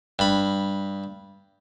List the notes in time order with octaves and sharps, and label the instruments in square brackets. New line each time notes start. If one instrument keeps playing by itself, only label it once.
[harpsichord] G2 B5